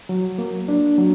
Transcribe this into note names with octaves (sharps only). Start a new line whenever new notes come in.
F#3
A#3
D4
F#3